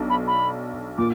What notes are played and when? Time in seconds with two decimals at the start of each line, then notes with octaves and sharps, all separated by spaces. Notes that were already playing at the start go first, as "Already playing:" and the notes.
Already playing: B1 D4
0.10 B5
0.27 B5
0.98 A#2 D6